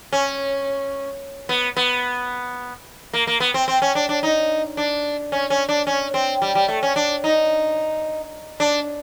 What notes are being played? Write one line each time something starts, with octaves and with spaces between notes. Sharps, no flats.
C#4
B3
B3
A#3
A#3
B3
C4
C4
C#4
D4
D4
D#4
D4
C#4
C#4
D4
C#4
C4
G3
G3
A3
C#4
D4
D#4
D4